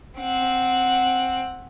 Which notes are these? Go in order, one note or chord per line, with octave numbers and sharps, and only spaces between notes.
C4 F#5